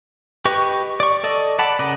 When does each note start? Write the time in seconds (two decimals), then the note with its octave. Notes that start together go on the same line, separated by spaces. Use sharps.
0.45 G4 B4 D#5 C#6
1.00 D5 C#6
1.24 A4 D5 D#5
1.59 D5 F#5 A5 B5
1.79 C#3 A#4 D5 D#5 F#5